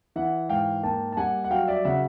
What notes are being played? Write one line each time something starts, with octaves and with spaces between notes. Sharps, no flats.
E3 E5 F#5
G#2 F5 G5
A#3 G5 A5
A5
G3 F#5 G#5
F#5
F#3 F5 G5
D5 E5
C#3 E5 F#5